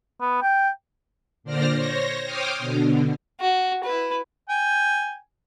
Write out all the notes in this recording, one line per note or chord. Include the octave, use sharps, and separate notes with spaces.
B3
G5
A#2 D3 C5 D5 F6 A#6
C5 C#5 A#6
C5 C#5 G5 D6 D#6 F6
B2 D3
F#4
E4 B4
G5 G#5